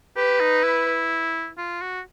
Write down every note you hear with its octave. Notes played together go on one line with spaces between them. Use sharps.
G4 B4
D#4
E4
F4
F#4